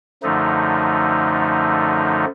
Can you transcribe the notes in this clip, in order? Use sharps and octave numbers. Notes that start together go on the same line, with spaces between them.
F#2 D3 F3 A3 D#4